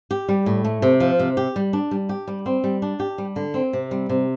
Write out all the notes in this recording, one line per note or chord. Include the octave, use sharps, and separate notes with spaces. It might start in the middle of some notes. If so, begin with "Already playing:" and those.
G4
G3
A2
A3
C3
F3
C3
G4
G3
D4
G3
G4
G3
C4
G3
D4
G4
G3
D3
C4
C3
G3
C3